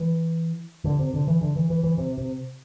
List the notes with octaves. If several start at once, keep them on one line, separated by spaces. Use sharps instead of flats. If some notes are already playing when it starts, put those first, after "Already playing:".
Already playing: E3
D3
C3
D3
E3
D3
E3
E3
E3
C3
C3